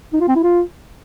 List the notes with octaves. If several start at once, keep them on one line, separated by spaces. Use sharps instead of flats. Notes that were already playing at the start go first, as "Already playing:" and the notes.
D#4
F4
C4
E4
F4